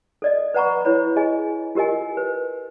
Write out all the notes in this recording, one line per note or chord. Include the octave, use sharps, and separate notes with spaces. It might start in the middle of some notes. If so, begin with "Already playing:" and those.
A4 D5 D#5
B4 D5 F#5 A#5 B5 C#6
E4 B4 C#5 B5
G#4 D#5 G#5
F4 G4 A#4 D#5 G#5
B4